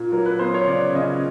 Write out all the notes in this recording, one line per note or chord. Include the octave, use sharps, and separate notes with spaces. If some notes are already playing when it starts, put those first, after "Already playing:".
Already playing: A#2
F#3 A#4
B4
B3 C5
C#5
C#3 D5
C#3 D#5